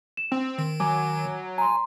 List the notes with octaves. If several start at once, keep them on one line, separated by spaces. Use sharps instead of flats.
E7
C4
D#3
F#3 G#5 D6
G#5 A#5 C6